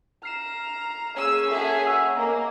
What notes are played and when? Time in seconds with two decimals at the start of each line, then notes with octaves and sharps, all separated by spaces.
0.23 A#5 F6 C7 E7
1.17 A#3 C#4 G#4 E6
1.50 F#4 G#4 A4 E5
1.84 C#5 F#5 G#5 A#5 E6
2.16 A#3 D#5 A#5